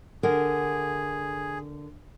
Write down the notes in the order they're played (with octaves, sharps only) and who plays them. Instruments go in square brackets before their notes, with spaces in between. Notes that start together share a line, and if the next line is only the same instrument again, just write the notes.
[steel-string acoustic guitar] D3 A#4 F#5 [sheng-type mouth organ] G#4